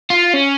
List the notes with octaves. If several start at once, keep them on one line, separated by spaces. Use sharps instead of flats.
F4
C#4